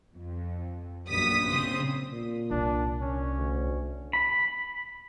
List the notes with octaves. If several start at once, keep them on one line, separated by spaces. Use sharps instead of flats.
F2
A#1 F#2 G3 B3 D#6 B6
C#3 C4 C5 D#6
A#2
C2 D4
C#4
D2
B5